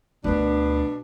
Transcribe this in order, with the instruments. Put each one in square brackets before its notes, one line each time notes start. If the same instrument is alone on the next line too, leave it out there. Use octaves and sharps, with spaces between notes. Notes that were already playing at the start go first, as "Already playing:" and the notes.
[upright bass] D2 D#3 [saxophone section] B2 B3 D4